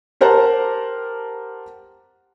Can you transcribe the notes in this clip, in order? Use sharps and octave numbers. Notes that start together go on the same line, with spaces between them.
G4 A#4 C5 F#5 A5